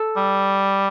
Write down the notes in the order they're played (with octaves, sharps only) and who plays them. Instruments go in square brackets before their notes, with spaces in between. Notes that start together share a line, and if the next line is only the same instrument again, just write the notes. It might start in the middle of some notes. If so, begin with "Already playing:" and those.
Already playing: [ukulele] A4
[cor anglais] G3